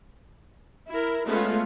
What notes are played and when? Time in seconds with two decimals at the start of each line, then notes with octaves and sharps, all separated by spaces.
0.89 E4 A#4
1.25 G#3 A3 B3 C#4 F4